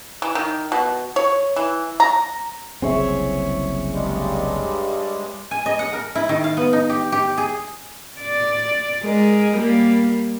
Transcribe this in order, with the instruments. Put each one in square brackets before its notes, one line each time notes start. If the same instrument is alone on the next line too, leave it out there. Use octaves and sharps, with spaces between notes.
[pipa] E3
D#3
B2
C#5
E3
A#5
[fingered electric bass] F#1 C2 C4 [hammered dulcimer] G#4 C#5 E5
[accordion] G2 G3 G#3
[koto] G#5
D#5
F#5
A#4
E4
D#3
F5
B3
D#4
G4
G4
G#4
[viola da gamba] D5
G#3 A#4
G3 A#3